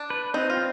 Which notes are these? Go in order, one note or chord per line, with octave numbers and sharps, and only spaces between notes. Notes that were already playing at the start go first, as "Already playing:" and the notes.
Already playing: D4
B4
C4 D#4
F4
C4